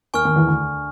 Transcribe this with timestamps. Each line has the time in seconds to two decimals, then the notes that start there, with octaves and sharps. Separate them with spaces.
0.14 D#2 D#3 G#5 C#6 F6
0.25 D#2 D#3
0.36 E2 E3
0.47 D2 D3